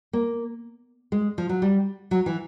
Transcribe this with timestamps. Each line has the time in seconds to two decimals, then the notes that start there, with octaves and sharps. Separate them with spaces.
0.13 A#3
1.12 G#3
1.38 F3
1.49 F#3
1.62 G3
2.11 F#3
2.26 E3